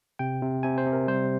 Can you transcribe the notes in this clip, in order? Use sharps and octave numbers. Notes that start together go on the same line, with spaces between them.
C3 G5
C3
C3 G#5
C5
C3
A#4
G3 C5